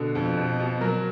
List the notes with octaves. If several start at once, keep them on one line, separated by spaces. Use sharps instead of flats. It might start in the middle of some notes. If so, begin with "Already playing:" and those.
Already playing: B2 D3
F2
B2
B2
F#3 A#4